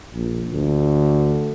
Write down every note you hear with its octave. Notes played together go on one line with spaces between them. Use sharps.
A#1
D2